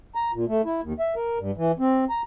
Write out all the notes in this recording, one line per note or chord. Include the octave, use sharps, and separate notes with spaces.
A#5
A#2
A3
E4
D#2
E5
A#4
G2
E3
C4
A#5